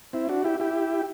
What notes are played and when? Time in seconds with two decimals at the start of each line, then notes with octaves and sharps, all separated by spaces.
0.13 C4 E4
0.29 D4 F#4
0.44 E4 G4
0.60 E4 G4